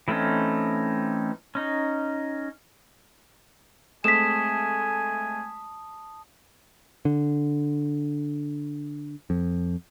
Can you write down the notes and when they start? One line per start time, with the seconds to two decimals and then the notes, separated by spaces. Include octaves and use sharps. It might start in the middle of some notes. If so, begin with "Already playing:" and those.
0.08 E3 A3 C4 C#4 D#4
1.55 C#4 D#4
4.04 G#3 A3 C4 G#5 A5 D#6 B6 E7
7.05 D3
9.30 F2